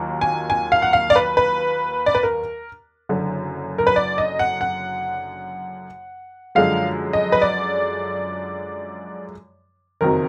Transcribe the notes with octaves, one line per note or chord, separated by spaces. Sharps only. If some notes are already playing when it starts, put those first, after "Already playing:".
Already playing: D#2 D#3 F#3 A#3 F4
G#5
G#5
F5
F#5
F5
D5
B4
B4
D5
B4
A#4
F#1 F#2 D3
A#4
B4
D5
D#5
F#5
F#5
F#2 D3 F3 G#3 F5
D#5
B4
D5
F#1 F2 D#3 F#3 A#4